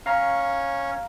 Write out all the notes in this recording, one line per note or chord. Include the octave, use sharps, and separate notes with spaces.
C#4 C#5 F5 A#5